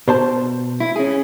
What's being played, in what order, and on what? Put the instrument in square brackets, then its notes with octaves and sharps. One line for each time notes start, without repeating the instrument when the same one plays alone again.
[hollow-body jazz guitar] B2 C5 A5
[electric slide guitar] E4
C#4 G#4